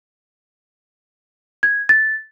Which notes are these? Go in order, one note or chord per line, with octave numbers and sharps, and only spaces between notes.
G#6
A6